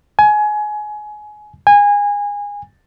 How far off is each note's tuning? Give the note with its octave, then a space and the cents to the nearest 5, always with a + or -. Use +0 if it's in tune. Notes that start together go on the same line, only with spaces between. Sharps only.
G#5 +20
G#5 -25